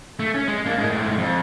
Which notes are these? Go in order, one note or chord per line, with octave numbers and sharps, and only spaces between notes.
A3
C#4
G#3
A#3 D4
A2 G#3
F2